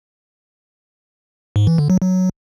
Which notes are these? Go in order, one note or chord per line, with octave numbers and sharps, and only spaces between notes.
G#2
E3
D3
F#3
F#3